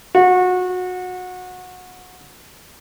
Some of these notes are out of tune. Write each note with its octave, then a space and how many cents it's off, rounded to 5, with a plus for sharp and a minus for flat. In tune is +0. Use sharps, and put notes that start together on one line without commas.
F#4 -25